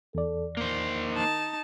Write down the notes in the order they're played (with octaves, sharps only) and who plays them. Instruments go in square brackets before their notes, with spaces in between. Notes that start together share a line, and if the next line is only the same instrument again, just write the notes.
[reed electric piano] E2 D5 [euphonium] A4
[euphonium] D#3 [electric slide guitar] A#3 C5
[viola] D#4 A5